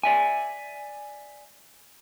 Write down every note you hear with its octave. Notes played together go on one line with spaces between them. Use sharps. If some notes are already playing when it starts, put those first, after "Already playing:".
D5 E5 G#5